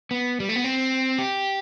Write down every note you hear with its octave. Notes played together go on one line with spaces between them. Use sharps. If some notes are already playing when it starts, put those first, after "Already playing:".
B3
G3
A3
B3
C4
G4